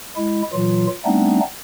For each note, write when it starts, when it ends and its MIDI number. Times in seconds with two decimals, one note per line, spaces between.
0.17 0.42 56
0.17 0.42 64
0.53 0.87 46
0.53 0.87 52
0.53 0.87 54
0.53 0.87 65
1.05 1.40 55
1.05 1.40 57
1.05 1.40 59
1.05 1.40 60
1.05 1.40 62
1.05 1.40 63